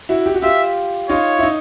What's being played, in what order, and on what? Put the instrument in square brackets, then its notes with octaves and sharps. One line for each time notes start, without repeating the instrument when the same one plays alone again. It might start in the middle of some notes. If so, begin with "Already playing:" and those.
[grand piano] E4 F#4
G4
F#4
[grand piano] F4 G4 [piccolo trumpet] E5
[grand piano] D#4 F4 [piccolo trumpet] C#5
[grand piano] E4
D#4